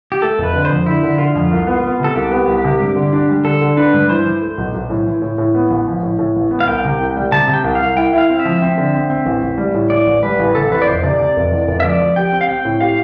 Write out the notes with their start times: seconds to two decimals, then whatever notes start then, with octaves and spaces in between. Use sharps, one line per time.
0.12 G4
0.22 A3 A4
0.38 F1
0.43 B4
0.54 D3
0.65 F2 C5
0.86 D3 E4
1.03 D3
1.18 D3 F4
1.35 F2
1.51 C2
1.67 B3
1.84 B3
2.00 C3 A4
2.15 C2 G4
2.31 B3
2.47 C2
2.64 C3
2.80 G2
2.96 D3
3.13 D4
3.29 G3
3.44 D3 A4
3.61 D3
3.77 D4 B4
3.93 G2
4.09 E3 C5
4.26 E3
4.42 A3
4.58 B1
4.74 B1
4.90 A2
5.06 E3
5.22 A2
5.38 A2
5.55 B3
5.70 A1
5.87 F3
6.03 A2
6.19 A2
6.36 A1
6.51 B3
6.60 F5
6.67 C2 G5
6.84 C3
7.00 C2
7.17 G3
7.32 C3 A5
7.48 C3
7.53 G5
7.64 C2
7.75 C2 F5
7.96 E4 G5
8.13 E4 F5
8.29 C4
8.40 E5
8.45 F3
8.62 C4
8.78 D3
8.94 C4
9.10 C4
9.26 A1
9.43 A1
9.58 G3
9.74 A2
9.90 A2 D5
10.07 A1
10.23 G3 B4
10.39 A1
10.55 C3 A4
10.71 E2 B4
10.82 D5
10.87 F1 C5
11.03 C3 D5
11.19 C3
11.36 F1
11.52 E2
11.68 F1
11.80 E5
11.84 F3 D5
12.00 F3
12.16 G4 G5
12.32 C4
12.41 F5
12.48 C4 G5
12.65 A2
12.81 G4 F5